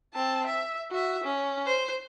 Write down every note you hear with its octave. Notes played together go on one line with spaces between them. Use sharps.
C4 A5
E5
F#4 E5
C#4
C5